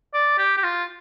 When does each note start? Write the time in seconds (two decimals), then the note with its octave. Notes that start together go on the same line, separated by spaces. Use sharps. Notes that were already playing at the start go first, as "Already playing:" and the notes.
0.14 D5
0.38 G4
0.57 G4
0.64 F4